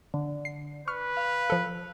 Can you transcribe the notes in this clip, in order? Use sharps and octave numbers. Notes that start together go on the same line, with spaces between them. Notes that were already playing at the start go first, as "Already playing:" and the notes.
D3
C7
B4 C#6 F6
F5
F3 A4